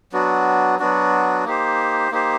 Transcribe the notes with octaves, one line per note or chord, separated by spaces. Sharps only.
F#3 B3 D4 F#4
F#3 B3 D4 F#4
A#3 D#4 G4 C5
A#3 D#4 G4 C5